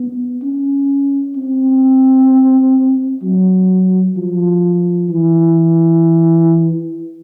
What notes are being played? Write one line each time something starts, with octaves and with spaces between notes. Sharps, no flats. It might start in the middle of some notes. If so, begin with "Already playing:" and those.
Already playing: B3
C#4
C4
F#3
F3
E3